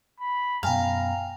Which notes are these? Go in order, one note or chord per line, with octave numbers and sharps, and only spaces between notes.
B5
F#2 B2 F5 G5 G#5 A#5 F7